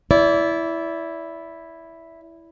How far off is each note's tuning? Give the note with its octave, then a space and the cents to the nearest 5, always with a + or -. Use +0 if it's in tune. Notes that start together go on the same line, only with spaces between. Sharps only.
E4 +0 D5 -30